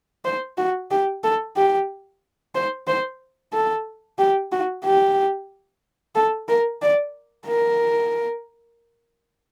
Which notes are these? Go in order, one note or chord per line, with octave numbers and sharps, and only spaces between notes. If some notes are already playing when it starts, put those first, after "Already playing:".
C5
F#4
G4
A4
G4
C5
C5
A4
G4
F#4
G4
A4
A#4
D5
A#4